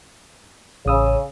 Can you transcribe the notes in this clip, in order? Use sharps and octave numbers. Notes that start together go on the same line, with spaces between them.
A1 C#3 D#6 E6